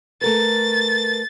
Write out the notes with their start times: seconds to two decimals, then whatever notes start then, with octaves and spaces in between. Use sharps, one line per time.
0.21 A3 A#4 B4 A6